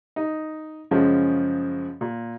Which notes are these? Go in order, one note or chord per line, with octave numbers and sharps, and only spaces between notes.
D#4
F#2 C#3 F3 G#3
A#2